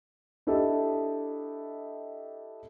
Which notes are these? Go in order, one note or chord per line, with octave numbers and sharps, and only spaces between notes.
D4 E4 G4 A4 D#5